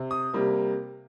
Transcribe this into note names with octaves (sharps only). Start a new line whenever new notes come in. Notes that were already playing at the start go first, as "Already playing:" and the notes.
Already playing: C3
D#6
C3 G3 A#3